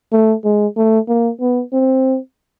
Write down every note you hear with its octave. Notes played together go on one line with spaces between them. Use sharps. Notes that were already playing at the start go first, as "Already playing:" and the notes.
A3
G#3
A3
A#3
B3
C4